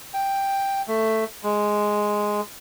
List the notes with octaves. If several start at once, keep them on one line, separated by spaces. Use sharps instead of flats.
G5
A3
G#3